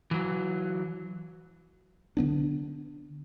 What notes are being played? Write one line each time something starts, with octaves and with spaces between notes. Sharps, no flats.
E3 F#3
D3 D#3 B3 D4